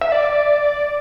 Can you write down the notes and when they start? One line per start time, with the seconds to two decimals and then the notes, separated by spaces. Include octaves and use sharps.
0.01 E5
0.12 D5